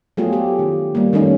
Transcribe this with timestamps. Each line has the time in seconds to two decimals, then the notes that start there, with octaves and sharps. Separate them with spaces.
0.17 F#3 A3 B3 F4 G4 G#4
0.33 G4
0.59 D#3
0.95 G3 A#3
1.13 D#3 A3 C#4 D#4